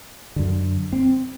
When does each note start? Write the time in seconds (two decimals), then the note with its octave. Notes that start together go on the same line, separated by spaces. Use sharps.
0.36 F#2 D3
0.93 C4